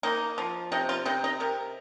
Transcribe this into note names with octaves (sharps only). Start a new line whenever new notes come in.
A#3 D#4
F3
C3 D#4
F4
C3 D#4
D#4
C3 A#4